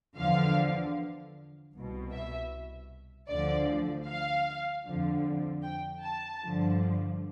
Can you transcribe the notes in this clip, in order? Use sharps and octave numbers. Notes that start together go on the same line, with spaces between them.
E2 D3 F3 F5
C2 B2
E5
D2 D3 F3 D5
F5
F2 D3 F3
G5
A5
G2 D3 F3